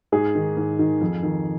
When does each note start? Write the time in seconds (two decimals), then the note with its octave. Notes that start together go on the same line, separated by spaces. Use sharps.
0.12 G#2 G#4
0.35 D#3
0.57 G#2
0.79 D#3
1.01 F2
1.23 D#3